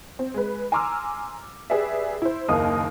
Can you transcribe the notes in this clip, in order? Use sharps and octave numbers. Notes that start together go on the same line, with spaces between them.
C4
G#3 B4
G#5 A#5 C6 D6 E6 F6
G4 G#4 B4 D5 E5
E4 C5
F#1 D#2 A#3 A#4 D#5 D#6